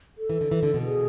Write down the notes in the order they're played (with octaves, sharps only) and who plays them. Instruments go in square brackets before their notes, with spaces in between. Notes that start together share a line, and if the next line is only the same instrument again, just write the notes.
[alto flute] A4
[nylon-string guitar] E3
D3
E3
D3
B2
[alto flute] G#4